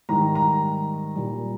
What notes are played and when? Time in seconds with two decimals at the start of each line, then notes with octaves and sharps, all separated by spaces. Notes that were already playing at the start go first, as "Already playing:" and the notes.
0.09 G#2 D#3 G3 A#5
0.35 A#5
1.15 A#2 G3